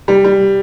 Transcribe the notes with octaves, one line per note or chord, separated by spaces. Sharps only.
G3
G3